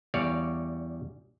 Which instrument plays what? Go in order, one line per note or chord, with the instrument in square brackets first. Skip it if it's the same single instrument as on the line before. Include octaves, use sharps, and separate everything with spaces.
[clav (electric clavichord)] E2 G3 C#5 D5 F5